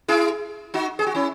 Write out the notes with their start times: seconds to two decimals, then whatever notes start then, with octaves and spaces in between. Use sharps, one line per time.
0.08 E4 G#4
0.74 D#4 F#4
0.99 G#4
1.06 F#4
1.14 C#4 E4